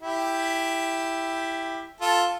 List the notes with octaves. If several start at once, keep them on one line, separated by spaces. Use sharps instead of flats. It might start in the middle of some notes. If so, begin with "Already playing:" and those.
E4 G4
F4 A4